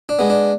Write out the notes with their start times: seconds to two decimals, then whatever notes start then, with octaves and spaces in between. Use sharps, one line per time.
0.09 D4
0.19 G#3 B3
0.30 D4